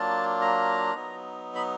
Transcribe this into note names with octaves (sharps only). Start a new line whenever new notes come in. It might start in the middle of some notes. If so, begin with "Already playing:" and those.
Already playing: F#3 A#3 D4 F4 A5
A#5
F#3 B3 D#4
B5